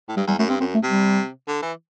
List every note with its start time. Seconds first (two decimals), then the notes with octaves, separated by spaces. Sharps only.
0.08 A2
0.16 G2 G3
0.27 E2 G3
0.39 F#2 A3
0.49 G2 C4
0.60 F#2 C4
0.74 A3
0.83 C3
0.89 G3
1.47 D3
1.62 E3